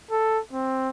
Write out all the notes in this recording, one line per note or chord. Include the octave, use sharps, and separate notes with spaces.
A4
C4